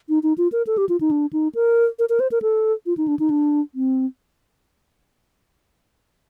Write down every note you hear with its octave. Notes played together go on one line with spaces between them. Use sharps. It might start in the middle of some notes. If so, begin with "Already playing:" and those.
D#4
D#4
F4
A#4
A4
G4
F4
D#4
D4
D#4
A#4
A#4
A#4
C5
A#4
A4
F4
D#4
D4
D#4
D4
C4